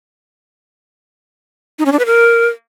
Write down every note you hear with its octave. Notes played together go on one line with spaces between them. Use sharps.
D#4
C#4
D4
B4
A#4